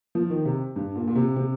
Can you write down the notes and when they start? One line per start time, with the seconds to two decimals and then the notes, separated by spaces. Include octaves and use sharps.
0.15 F3
0.30 D#3
0.45 C3
0.76 G2
0.96 A#2
1.08 A#2
1.15 C3
1.36 C3